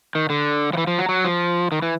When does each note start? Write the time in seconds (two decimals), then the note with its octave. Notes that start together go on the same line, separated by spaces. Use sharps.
0.15 D#3
0.30 D3
0.73 F3
0.78 E3
0.87 F3
0.99 F#3
1.09 F#3
1.24 F3
1.72 D#3
1.82 E3